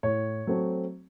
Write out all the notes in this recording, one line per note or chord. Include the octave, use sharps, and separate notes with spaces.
A2 C#5
F#3 A3 C4